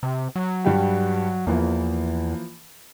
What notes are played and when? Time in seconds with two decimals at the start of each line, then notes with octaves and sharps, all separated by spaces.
0.03 C3
0.36 F#3
0.64 G2 G3 G4
1.47 E2 E3 F3 A#3